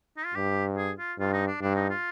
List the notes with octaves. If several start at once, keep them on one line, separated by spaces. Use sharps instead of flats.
D#4
F4
G2 G4
G#4
F4
G2 F4
D#4
D4
G2 D4
D#4
F4